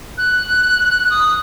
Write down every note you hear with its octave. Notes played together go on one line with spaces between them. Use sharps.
F#6
D#6